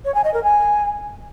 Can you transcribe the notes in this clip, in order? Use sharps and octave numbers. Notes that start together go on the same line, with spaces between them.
C#5
G#5
D#5
A#4
G#5